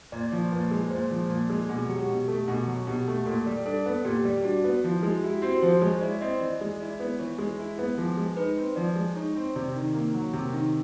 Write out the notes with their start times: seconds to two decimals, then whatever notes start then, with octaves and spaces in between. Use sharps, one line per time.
0.12 A#2 D5
0.32 F3 C#5
0.52 A#2 B4
0.71 G#3
0.90 A#2 C5
1.11 F3
1.29 A#2
1.50 G#3
1.69 B2 G#4
1.88 F#3 G4
2.08 B2 G4
2.28 A3 A4
2.48 B2 G#4
2.67 F#3
2.87 B2 G4
3.07 A3
3.26 A#2 A4
3.47 G3
3.66 D4 A4
3.86 B3
4.05 A#2 G4
4.25 G3
4.44 D4 F#4
4.64 B3
4.84 F3 E4
5.03 G#3 F#4
5.23 E4 G4
5.42 C4 F#4
5.62 F3 C5
5.81 G#3 C#5
6.01 E4 D5
6.21 C4 D#5
6.41 E3 D5
6.61 G#3
6.80 E4 D5
7.00 B3
7.19 E3 C#5
7.38 G#3
7.58 E4
7.79 B3
7.98 F3 G#4
8.17 G#3
8.37 D#4 B4
8.57 C4
8.76 F3 D5
8.96 G#3
9.15 D#4 C#5
9.36 C4
9.56 C3 D5
9.75 D#3
9.94 A#3
10.14 F#3
10.33 C3
10.53 D#3